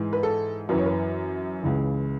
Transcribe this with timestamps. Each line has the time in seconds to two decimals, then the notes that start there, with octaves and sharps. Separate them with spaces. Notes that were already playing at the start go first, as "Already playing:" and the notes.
Already playing: G#2 E3
0.13 B4
0.23 A4
0.69 F#2 E3 B4
0.78 C#5
0.86 B4
1.62 C#2 C#3 E3